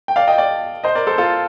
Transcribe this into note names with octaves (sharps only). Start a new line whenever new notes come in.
G5
D5 F5
D#5 G5
D5 F5
C5 D#5
A#4 D5
A4 C5
F4 A4